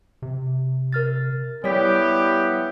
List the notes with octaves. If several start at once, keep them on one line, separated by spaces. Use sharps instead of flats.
C3
A#4 F6 A6
G3 B3 E4 G4 C#5 D5 B6